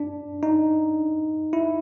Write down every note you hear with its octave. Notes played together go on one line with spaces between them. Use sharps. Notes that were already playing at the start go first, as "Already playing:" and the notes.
Already playing: D4
D#4
E4